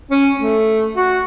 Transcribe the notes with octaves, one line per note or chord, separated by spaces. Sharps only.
C#4
A3
F#4